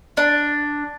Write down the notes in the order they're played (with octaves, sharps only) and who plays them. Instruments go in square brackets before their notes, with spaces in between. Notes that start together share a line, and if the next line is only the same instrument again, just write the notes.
[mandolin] D4